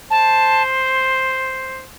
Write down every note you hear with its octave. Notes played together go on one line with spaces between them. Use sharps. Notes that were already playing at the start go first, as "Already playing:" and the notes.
C5 A5